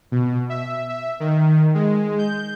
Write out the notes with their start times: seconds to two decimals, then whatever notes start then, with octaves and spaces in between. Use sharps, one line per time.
0.12 B2
0.50 E5
0.89 E5
1.20 D#3
1.75 G#3
2.18 G6